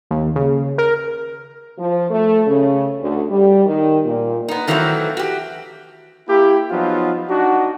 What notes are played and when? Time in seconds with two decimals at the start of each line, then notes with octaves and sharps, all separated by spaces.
0.11 D#2
0.36 C#3
0.78 A#4
1.78 F3
2.10 A3
2.48 C#3
3.01 D2
3.30 G3
3.66 D#3
4.05 A#2
4.48 B3 D#4
4.67 D#3 E3 F#3 A3 A#3 C4
5.17 F#4 G4
6.28 A#3 E4 G4
6.71 F3 F#3 B3 D#4 F4
7.29 D4 D#4 F#4